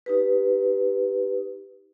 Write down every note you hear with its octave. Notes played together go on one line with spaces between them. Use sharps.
D#4 G4 B4